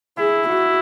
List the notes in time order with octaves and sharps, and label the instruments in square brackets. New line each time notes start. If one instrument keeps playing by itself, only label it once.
[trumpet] E4 [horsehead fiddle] G#4
[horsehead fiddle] F#4